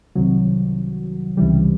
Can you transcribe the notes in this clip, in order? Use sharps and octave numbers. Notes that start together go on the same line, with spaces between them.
C2 C3 D#3 F#3
C#2 C3 E3 G3